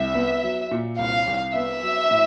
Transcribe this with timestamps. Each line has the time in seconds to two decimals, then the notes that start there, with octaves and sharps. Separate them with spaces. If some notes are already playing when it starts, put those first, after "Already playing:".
Already playing: C2 E5
0.15 B3
0.43 F#3
0.71 A#2
0.99 C2 F5
1.27 C2
1.55 B3 E5
1.82 F#3
2.11 A2